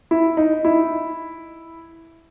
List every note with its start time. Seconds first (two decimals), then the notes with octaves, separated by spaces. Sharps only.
0.11 E4
0.37 D#4
0.65 E4